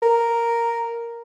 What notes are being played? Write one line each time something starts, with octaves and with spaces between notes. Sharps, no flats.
A#4